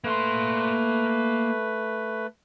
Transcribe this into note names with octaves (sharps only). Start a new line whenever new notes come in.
A3 A#3 B4 C6